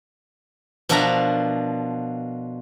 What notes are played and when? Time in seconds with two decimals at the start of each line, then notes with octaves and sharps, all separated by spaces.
0.89 B2 F3 D4 A#4 E5 A#5